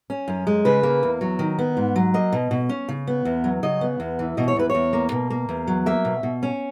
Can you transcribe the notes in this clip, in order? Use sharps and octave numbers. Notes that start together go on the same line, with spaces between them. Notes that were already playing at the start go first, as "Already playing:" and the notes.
C#4
F#2
G#3
C#3 B4
A#3
E2
F#3
D#3
B3
G#2
F#3
A#3 D#5
B2
B2
C#4
C#3
B3
E2
F#3
C#3 D#5
B3
E2
E3
B2 D#5
C#5
E2 B4
C#5
E2
A#3
B2
A#3
E2
F#3
A#3 E5
B2
B2
C#4